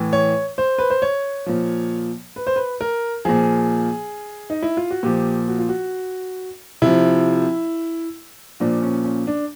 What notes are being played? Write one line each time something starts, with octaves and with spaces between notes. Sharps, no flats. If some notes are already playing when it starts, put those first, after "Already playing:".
Already playing: A2 E3
C#5
C5
B4
C5
C#5
A#2 F3
B4
C5
B4
A#4
A#2 F3 G#4
D#4
E4
F4
F#4
A#2 F3 G4
F#4
F4
F#4
C3 F3 E4
A#2 F3 D4
C#4
C#4
D4